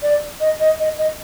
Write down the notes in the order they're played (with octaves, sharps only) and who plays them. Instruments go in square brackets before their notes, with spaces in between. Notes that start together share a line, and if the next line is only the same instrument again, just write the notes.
[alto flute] D5
D#5
D#5
D#5
D#5